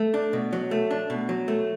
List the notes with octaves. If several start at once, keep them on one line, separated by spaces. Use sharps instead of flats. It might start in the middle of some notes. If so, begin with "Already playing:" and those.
Already playing: A3
D4
B2
F#3
A3
D4
B2
F#3
A3